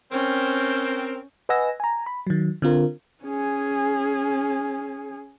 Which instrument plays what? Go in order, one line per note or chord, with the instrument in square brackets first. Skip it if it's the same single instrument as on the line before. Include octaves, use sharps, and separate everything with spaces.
[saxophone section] C4 A#4 [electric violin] C#4 G6
[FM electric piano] B4 D#5 F#5 G#5 E6 A#6
G#5 A#5
B5
D#3 F#3
D3 C4 F4 A#4
[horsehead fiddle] C#4 G#4